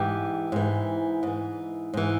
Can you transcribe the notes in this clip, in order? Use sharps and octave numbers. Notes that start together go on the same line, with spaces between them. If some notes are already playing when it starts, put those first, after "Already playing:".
Already playing: G#2 E3 G4
G#2 E3
G#2 E3
G#2 E3